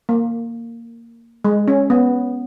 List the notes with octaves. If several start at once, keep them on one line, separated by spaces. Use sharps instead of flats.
A#3
G#3
C#4
B3